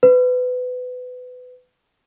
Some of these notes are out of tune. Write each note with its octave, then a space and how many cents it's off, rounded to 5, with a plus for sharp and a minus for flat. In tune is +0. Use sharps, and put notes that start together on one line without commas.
B4 +25